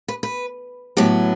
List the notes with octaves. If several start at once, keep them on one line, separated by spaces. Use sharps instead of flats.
B4
B4
A2 F#3 B3 G4